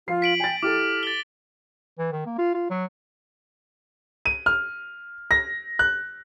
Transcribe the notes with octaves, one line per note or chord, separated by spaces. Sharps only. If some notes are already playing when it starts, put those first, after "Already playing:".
F3 F4 C7
B6 D7 F#7
G5 G#5 A6
E4 G4 A4 D6 F6
A6 G7
E3
D#3
A#3
F4
F4
F#3
D#7
F6
A#6
F#6